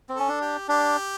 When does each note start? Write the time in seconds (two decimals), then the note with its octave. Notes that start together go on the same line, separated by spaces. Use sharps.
0.09 C4
0.15 C#4 A4
0.28 D4
0.41 G4
0.68 D4 G4